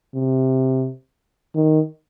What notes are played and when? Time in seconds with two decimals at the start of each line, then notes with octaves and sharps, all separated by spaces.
0.15 C3
1.55 D#3